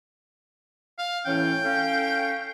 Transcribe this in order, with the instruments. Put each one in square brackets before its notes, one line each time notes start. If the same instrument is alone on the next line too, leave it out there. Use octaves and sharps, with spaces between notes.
[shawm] F5
[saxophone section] A2 E3 C#4 [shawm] G5
[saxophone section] C#4 A4 F5